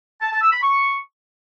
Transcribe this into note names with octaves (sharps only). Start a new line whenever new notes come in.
A5
A5
E6
B5
C#6